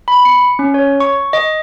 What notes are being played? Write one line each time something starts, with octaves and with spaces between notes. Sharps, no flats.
B5
C#7
C#4
C#5
C#6
D#5